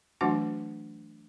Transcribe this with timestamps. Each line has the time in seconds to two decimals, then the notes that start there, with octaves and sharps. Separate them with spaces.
0.21 E3 F#3 A3 D4 F#4 F#5